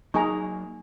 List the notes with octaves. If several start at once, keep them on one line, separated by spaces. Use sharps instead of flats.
F#3 A#3 D#4 G#4 G#5 A#5 C#6